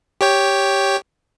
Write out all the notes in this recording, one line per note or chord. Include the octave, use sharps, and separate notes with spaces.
G4 C#5 G5